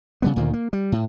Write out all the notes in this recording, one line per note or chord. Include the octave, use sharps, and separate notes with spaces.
C#3 G3 B3
D2 A#2 D#3 A#3
A#3
G3
A2